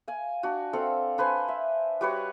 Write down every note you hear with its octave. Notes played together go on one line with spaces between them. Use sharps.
F5 G#5
D4 F#4
C4 A4 F5 F#5
D4 B4 C5 G#5
E5
G3 F#4 B4 C#5